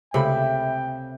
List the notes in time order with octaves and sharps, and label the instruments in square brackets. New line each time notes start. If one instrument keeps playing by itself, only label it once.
[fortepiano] C#2 A3 B5 [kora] C3 [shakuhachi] E5 [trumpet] G5